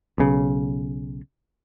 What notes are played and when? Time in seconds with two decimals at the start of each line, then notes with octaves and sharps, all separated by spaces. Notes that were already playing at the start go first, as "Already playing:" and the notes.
0.18 B1 C#3